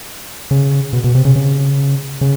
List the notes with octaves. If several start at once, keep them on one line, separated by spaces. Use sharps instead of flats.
C#3
B2
B2
C3
C#3
C#3
C#3